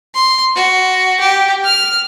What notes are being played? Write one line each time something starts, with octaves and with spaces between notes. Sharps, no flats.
C6
F#4
G4
F6